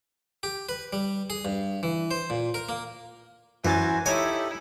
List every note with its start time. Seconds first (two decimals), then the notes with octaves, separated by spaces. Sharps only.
0.43 G4
0.69 B4
0.93 G3
1.30 G#4
1.45 G2
1.83 E3
2.11 C5
2.30 A#2
2.54 A#4
2.69 A#3
3.65 F#2 E3 F#3 F#4 A#4 C5 G#5 A6
4.06 D#4 E4 G4 A4 C#5 G#5